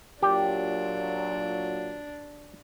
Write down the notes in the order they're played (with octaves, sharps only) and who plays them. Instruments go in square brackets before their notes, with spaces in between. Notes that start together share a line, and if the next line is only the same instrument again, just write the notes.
[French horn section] A#2 F#3 [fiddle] D4 [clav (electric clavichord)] G4